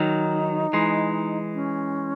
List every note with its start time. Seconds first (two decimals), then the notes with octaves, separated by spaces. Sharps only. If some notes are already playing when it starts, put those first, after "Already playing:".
Already playing: D#3 F#3 D#4
0.73 E3 G#3
1.55 C#4